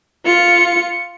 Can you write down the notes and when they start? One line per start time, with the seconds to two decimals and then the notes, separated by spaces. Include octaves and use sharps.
0.25 F4 C#7